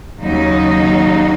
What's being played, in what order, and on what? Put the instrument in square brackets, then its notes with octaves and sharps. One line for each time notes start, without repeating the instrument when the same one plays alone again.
[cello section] D#2 C#3 F#3 D#4